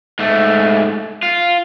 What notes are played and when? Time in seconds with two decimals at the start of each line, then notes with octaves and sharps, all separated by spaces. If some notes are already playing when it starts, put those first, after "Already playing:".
0.19 G#2 A3
1.23 F4